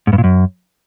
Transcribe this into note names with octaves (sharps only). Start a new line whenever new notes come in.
G#2
G2
A#2
F#2